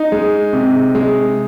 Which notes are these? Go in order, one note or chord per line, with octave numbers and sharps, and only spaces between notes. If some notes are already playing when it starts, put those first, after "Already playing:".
Already playing: D#4
G#3
C3
G#3